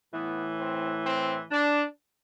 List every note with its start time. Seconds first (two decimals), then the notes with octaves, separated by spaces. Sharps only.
0.13 A2 E3 B3
0.59 C4
1.06 C4
1.51 D4